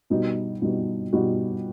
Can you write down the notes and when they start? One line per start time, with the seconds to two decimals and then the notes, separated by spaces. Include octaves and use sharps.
0.10 B2 G3 D#4 F#4
0.62 B2 G3 D#4 F#4
1.13 B2 G3 D#4 F#4